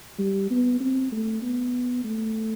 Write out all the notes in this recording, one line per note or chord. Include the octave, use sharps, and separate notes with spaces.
G3
B3
C4
A3
B3
A3